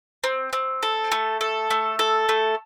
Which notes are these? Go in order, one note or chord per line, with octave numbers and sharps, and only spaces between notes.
C4
C4
A4
A3
A4
A3
A4
A3